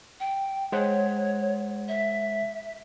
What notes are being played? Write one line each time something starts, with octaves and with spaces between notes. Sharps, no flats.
G5
G#3 C5 C#5 F#5
E5